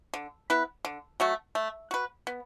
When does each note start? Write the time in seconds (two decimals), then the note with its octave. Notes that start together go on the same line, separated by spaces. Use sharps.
0.14 D3
0.50 B3 E4 B4
0.85 D3
1.20 F#3 A3 F#4
1.55 A3
1.91 F#4 B4
2.27 B3